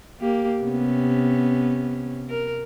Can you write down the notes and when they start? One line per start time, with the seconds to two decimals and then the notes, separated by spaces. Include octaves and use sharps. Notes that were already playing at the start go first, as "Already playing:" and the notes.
0.20 A#3 G4
0.62 C3 B3 C#4
2.29 A#4